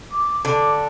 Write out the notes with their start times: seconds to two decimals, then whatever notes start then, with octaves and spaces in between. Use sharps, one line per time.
0.11 D6
0.45 D3 D6